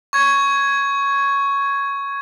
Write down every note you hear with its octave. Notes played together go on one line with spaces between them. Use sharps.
C#6 G#6